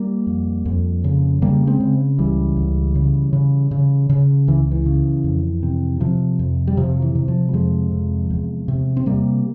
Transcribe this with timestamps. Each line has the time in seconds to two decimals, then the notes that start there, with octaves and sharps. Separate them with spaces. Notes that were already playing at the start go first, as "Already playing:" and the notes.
Already playing: G3 A#3
0.27 F2
0.65 F2
1.04 C#3
1.42 C#3 G3 A#3
1.67 G#3 C4
1.80 C#3
2.18 C#2 E3 G3
2.56 C#2
2.95 C#3
3.33 C#3
3.71 C#3
4.10 C#3
4.48 C#2 E3
4.71 E3
4.86 C#3
5.24 F2
5.63 C3
6.00 C3 F3
6.39 F2
6.67 G3
6.77 C3 F3
7.02 E3
7.15 C3
7.28 F3
7.48 G3
7.53 F2 F3 G#3
7.92 C3
8.30 E2
8.68 C3
8.97 C4
9.06 C3 G3 A#3